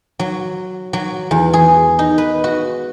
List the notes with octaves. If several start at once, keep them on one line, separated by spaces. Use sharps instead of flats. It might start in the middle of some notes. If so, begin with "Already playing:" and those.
F#3
F#3
E2
G#4
D#4
B4
F#4